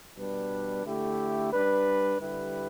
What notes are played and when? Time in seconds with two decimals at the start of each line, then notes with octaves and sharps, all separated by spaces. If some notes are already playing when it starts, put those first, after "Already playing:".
0.17 B2 G3 D4 B4
0.85 D3 A3 E4 G4
1.53 G3 D4 B4
2.21 D3 G3 E4 G4 B4